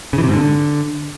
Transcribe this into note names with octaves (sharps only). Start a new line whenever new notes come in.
C#3
E3
C3
G#2
D3